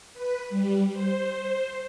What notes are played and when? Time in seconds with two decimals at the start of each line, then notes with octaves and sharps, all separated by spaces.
0.13 B4
0.50 G3
0.92 C5